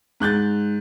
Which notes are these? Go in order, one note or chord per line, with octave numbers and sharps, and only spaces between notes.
G#2 F#6 G6 A6